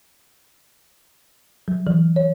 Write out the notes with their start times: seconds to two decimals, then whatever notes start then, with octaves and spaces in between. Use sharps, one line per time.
1.68 F#3
1.87 E3
2.16 C#5